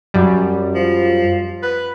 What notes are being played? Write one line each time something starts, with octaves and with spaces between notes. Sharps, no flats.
F#2 G3
F3
B4